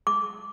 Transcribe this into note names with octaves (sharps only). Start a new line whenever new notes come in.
D6